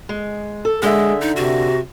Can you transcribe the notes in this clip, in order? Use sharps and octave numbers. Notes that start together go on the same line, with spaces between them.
G#3
A4
D3 G#3 G#4 E5
D#4
C3 F#4